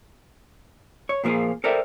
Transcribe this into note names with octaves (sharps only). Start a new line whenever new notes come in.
C#5
A#2 F3 A#3 F4 G#4
A4 A#4 C5 D5 E5 G5